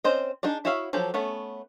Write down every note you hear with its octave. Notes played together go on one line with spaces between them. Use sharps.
C4 C#4 C5 D#5
D4 D#4 G#4 D5
E4 F#4 C#5 E5 F5
F3 F#3 G4 A4
A3 B3 C#4